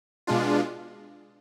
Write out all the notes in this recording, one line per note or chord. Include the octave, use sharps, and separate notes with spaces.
B2 G#3 D4 F4